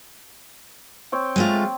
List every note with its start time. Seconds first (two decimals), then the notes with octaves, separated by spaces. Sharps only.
1.12 C4 C#5 G5
1.36 G#3 A3 F4